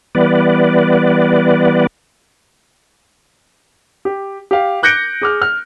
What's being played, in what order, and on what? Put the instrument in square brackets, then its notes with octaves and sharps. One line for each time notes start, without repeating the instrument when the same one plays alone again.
[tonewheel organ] E3 G3 B3 B4 D5
[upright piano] G4
G4 F5
D6 F#6 G6 A#6 C#7 D7
G#4 D6 F6
F6